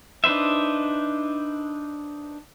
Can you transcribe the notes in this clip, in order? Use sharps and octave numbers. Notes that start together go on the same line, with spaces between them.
D4 D#4 B4 C5 E5